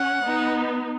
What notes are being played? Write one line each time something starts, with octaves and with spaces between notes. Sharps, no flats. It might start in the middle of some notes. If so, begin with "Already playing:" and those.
Already playing: C#4 F#5
B3 D#4